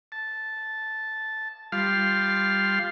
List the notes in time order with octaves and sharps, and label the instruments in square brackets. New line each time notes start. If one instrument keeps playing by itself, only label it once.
[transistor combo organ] A5
G3 F4 F5 C6